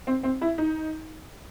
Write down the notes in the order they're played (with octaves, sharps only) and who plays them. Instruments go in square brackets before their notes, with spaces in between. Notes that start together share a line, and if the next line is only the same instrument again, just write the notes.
[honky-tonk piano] C4
C4
E4
D#4